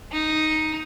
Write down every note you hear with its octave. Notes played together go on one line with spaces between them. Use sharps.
D#4